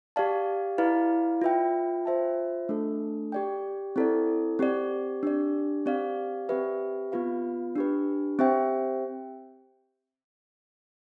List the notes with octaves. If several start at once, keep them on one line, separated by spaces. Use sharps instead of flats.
G4 D5 F5 A5
E4 B4 D5 F5
F4 B4 E5 G5
F4 C5 E5 A5
A3 D4 A4
G4 D5 G5
C4 E4 A4 D5
C4 G4 D5
D4 G4 D5
C4 G4 D5 F5
C4 G4 B4 E5
B3 F4 B4 F5
D4 G4 B4
C4 G4 C5 E5 G5